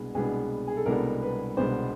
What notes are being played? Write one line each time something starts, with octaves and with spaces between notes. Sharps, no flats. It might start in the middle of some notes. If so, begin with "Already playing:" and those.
Already playing: C2 B2 G#3 B3 D4 G#4
C2 B2 G#3 B3 D4 G#4
G#4
A4
C2 B2 G#3 B3 D4 A#4
B4
C2 B2 G#3 B3 D4 C5